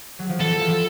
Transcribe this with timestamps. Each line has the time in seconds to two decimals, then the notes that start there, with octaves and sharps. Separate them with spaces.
0.19 F#3
0.29 F3
0.40 E3 A4
0.61 F3